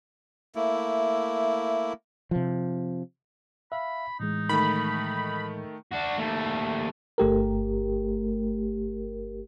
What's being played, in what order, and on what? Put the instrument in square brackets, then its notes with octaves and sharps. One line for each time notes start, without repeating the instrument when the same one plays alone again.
[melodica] A3 A#3 E4
[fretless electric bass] C3 F3
[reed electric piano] E5 F5 [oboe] B5
[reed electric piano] A2 E3 G#3 [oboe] D#4
[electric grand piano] D#3 A3 [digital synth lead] B5
[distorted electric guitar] D4 F#4
D#2 A3
[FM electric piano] G1 A3 G4 A#4